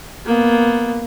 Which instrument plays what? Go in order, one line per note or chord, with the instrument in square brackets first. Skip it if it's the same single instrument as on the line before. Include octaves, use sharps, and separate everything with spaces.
[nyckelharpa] A#3 B3